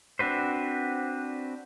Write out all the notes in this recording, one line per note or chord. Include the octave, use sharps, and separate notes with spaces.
C4 D4 F#4 B4 C5